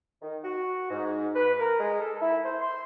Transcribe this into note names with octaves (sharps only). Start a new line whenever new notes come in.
D#3
F#4
G#2
B4
A#4
G#3
A4
E4
C5
C6